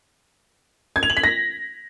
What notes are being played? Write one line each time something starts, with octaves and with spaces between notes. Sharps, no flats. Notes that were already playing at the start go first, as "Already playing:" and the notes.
G#6
F7
F#7
B6
A#6